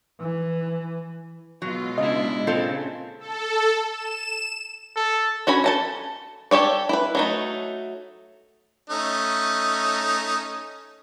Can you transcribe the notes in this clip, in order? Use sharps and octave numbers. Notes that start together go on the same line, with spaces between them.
E3
B2 F#3 G#3 F4
C#3 D4 E4 D#5
A#2 C#3 C4 F4 A4
A4
E7
A4
C#4 F#4 G#5 B5
A4 A5 A#5
G4 A4 C#5 D5
E4 B4
F#3 A3 D#4
A3 C#4 D#4